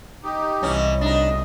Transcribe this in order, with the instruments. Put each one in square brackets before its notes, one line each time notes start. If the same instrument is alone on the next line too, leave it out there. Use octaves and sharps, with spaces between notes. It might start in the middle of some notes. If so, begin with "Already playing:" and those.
[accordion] D#4 G4
[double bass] C2 [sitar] B2 E3 C#4
[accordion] D2 B2 D#5 [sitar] D4 D#4